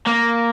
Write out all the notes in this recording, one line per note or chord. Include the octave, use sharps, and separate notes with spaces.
A#3